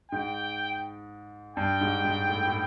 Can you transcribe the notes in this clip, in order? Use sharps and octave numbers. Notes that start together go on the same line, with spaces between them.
G#2 G5
G2 G5
G#2
G#2
A2
A2